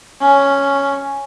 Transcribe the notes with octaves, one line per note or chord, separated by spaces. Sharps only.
C#4